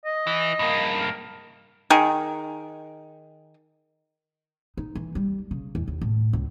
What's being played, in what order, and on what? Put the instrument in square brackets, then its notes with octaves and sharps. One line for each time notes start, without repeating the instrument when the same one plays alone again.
[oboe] D#5
[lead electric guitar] E3
G2 A#3
[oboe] A#4
[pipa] D#3 G#4 A#4
[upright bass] D#4
E3
G3
C#3
E2
D#2
A2
C#2